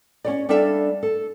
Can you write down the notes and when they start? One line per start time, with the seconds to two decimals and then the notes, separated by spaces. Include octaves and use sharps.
0.24 C#4 C#5 D5
0.49 G3 D4 A4 D5 E5 F5
1.03 A4